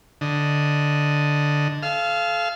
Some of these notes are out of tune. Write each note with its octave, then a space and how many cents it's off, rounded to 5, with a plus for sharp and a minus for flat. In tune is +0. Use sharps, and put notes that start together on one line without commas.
D3 +0 D#5 +0
A4 -40 F5 -15